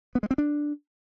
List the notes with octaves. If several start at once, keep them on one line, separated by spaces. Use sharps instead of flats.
B3
G#3
C4
D4